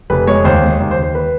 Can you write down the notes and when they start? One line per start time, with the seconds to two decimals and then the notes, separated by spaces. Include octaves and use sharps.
0.10 F1 B4
0.27 G#3 C#5
0.45 D#2 C5
0.62 G#3
0.80 D#2
0.91 C5
0.97 D#2
1.03 C5
1.15 B4